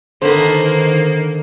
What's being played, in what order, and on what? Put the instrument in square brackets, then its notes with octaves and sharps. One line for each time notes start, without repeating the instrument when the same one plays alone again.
[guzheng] D3 B5 [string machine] D#3 [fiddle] A#3 [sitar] B3 C5